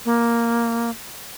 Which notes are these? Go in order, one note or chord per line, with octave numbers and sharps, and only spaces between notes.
A#3